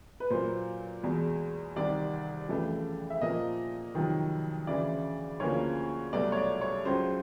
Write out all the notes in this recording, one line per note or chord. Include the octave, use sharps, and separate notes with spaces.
B4
A#2 F#3 A#3 C5
E2 B2 G#3
C2 C3 D#3 D5
F2 C#3 E3 A3
E5
A#2 F3 A#3 D#5
F2 C3 D#3 F#3
D2 C#3 E3 D5
D2 C#3 F3 A#3 C#5
C2 B2 F#3 A3 D5
C#5
D5
C#5
C#2 C#3 F#3 C5